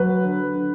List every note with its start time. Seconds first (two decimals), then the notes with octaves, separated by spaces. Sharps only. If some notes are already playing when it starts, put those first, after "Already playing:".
Already playing: F#3 B4
0.24 D3
0.55 D3